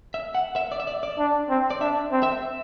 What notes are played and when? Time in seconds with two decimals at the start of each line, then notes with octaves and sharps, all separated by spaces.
0.14 E5
0.35 F#5
0.56 E5
0.72 D5
0.80 E5
0.87 D5
1.03 D5
1.18 D4
1.49 C4
1.70 D5
1.81 D4 E5
2.12 C4
2.23 E5